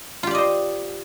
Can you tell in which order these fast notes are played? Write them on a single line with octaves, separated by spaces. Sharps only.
F4 G4 D5 D#5 C5